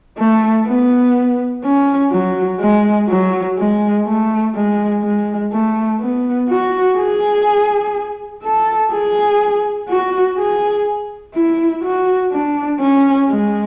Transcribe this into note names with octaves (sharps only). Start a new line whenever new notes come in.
A3
B3
C#4
F#3
G#3
F#3
G#3
A3
G#3
G#3
A3
B3
F#4
G#4
A4
G#4
F#4
G#4
E4
F#4
D4
C#4
G#3